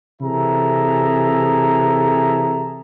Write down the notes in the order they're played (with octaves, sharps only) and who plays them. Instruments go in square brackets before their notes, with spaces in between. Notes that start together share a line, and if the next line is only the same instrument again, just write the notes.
[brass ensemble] C3 E3 G#4 A4 E5 A#5